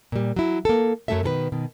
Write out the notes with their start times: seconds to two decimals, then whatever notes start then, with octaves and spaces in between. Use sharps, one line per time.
0.12 A#2 G3
0.36 F#3 E4
0.65 A#3 A4
1.08 F#2 F#3 A3 C#4 A4 E5
1.23 B2 D#3 A4 B4
1.52 B2 D#3